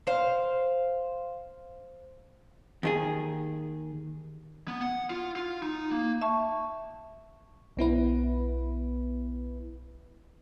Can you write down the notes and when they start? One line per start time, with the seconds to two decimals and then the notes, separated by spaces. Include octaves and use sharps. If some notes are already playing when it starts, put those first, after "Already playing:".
0.07 C5 F5
2.83 D#2 D#3 G#4
4.68 B3
4.81 F#5
5.10 F4
5.36 F4
5.63 D#4
5.91 A#3
6.22 E5 A5 C#6
7.77 B1 B3 E4 B4